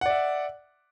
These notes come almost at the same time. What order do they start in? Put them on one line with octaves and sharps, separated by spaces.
F#5 D5 E5